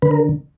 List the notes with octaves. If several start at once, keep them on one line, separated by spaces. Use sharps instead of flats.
D3 B4
A#4